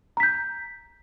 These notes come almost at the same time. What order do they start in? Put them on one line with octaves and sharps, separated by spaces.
A#5 B6 G6